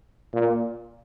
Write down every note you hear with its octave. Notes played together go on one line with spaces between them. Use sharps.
A#2